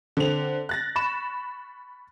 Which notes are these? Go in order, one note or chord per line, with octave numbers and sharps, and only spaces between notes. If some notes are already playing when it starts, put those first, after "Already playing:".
D3 C4 F7
F#6 A6 A#6
B5 C#6 E7